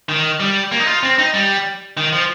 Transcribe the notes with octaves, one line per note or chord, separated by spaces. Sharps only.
D#3
G3
A#3
D#4
F4
C4
D#4
G3
D#3
F3